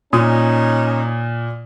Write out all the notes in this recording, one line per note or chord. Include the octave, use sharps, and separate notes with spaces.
A#2 C#4 D#4 D#6